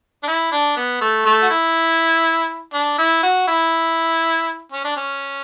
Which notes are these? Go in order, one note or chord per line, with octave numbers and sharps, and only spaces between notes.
D4
E4
D4
B3
A3
A3
F#4
E4
D4
E4
F#4
E4
C#4
D4
C#4